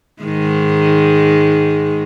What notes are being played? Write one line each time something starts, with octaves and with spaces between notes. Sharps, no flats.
G#2 D#3 G#3